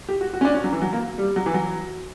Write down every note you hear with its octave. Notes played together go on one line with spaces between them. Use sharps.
G4
F#4
F#4
C#4
D4
C#4
F#3
E3
F#3
A#3
G3
F#3
E3
F#3